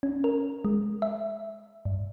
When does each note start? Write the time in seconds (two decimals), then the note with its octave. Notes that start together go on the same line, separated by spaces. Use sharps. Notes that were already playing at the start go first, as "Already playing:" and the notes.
0.03 C#4
0.24 A#4
0.65 G#3
1.02 E5
1.85 G2